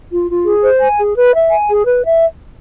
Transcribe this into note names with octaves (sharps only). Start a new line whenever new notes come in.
F4
F4
G#4
C5
G#5
G#4
B4
E5
G#5
G#4
B4
E5